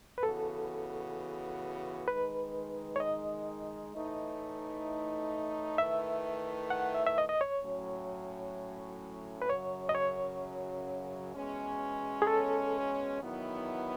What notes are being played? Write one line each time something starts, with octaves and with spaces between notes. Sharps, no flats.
B4
C#3 E3 B3 F#4 A4
D#3 G#3 D#4 B4
C#5
D#5
A2 E3 A3 D#4
D#3 A3 E4 B4 E5
F#5
E5
E5
D#5
D#5
C#5
A2 F#3 C#4
B4
F#2 C#3 F#3 C#5
D#5
C#5
E2 B2 G#3 C#4
G#4
A4
E2 D#3 F#3 B3 E4